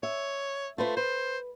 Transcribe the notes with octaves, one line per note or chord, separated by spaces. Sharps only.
C#5 E5
A3 F4 B4 C5
B4 C5